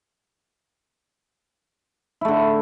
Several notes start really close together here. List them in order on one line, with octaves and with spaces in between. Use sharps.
E4 A3 D3